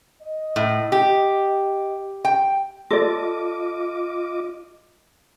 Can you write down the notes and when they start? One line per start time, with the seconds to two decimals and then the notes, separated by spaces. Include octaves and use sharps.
0.22 D#5
0.56 A2
0.92 G4
2.25 G5
2.91 F4 A4 D5 D#5 D6